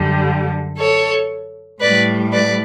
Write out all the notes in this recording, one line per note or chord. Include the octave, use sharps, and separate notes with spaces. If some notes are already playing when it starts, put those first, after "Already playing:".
Already playing: F#2 D3 G3
A4 C#5
A2 G3 B4 D5
B4 D5